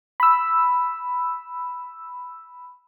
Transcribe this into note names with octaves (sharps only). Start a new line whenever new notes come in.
B5 E6